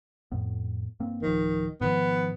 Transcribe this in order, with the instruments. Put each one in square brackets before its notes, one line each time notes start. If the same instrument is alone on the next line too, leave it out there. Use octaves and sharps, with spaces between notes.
[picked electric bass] F2 A2 B3
G2 A#3 C4
[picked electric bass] D1 F3 [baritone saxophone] D#3
[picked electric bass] G#2 D#3 F3 [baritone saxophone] B3